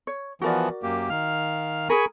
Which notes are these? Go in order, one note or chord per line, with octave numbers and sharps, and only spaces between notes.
C#5
E3 F3 B3 F#4 A#4 D5
F#2 A#3 G4
D#3 F5 F6
G#4 A#4 G#5 B5 C#6